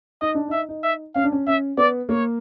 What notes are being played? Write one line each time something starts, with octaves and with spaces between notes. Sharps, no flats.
D#4 D#5
D4
D#4 E5
D#4
E5
C#4 F5
D4
C#4
C#4 E5
B3 D5
A#3 C#5